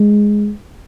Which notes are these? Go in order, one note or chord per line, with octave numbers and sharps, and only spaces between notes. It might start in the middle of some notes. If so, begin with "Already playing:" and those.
Already playing: G#3